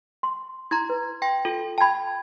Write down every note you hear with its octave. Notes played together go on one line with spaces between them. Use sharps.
C6
E4 A#5 C6 G#6
B4
G5 C6 A#6
F4 A4
G5 A5 B5 G#6